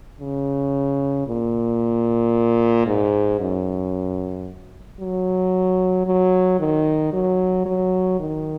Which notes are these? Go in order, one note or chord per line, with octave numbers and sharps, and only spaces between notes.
C#3
A#2
G#2
F#2
F#3
F#3
D#3
F#3
F#3
D#3